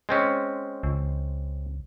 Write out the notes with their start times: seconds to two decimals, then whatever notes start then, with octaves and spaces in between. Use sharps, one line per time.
0.09 G#3 C4 C#4
0.83 C#2